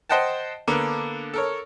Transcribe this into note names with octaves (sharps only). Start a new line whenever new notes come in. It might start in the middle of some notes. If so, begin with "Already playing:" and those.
C5 D#5 F#5 G5 A5
D3 A#3 B3 D4
A4 A#4 C#5